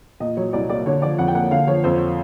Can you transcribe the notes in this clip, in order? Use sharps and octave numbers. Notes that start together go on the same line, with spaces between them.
A#2 D#5
F#3 C#5
C2 D5
A#3 D5
D3 C#5
F3 D5
F2 F#5
G5
A#3 F#5
D3 F5
F3 C#5
F2 C5